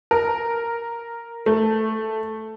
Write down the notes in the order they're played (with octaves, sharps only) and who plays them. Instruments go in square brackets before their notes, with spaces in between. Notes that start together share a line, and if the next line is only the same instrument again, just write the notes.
[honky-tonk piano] A#4
A3